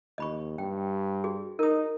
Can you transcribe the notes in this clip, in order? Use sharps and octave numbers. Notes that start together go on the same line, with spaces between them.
D#2 D#5 B5 C#6
G2 G5
F#4 G#4
D#4 A#4 D#6